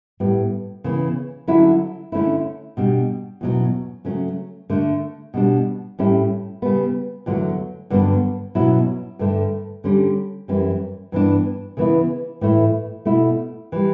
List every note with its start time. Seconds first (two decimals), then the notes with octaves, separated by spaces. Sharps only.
0.20 A2 G3 B3
0.84 C#3 E3 B3
1.47 D3 F#3 C#4 E4
2.12 D3 A3 C#4 E4
2.77 B2 G3 D4
3.41 E2 B2 F#3 C#4
4.05 C#3 F#3 A3 C#4
4.70 D3 A3 D4
5.34 B2 G3 D4
5.99 A2 G3 C#4 E4
6.62 C#3 G3 B3
7.26 E2 D3 F#3 A3
7.90 G2 D3 F#3 B3 D4
8.55 B2 F#3 C#4 E4
9.19 G2 D3 A3
9.84 D3 G3 C#4
10.48 F#2 E3 G3 C#4
11.12 G2 E3 B3 D4
11.77 C#3 E3 B3 E4
12.41 A2 E3 A3 E4
13.05 B2 A3 E4
13.72 E3 G3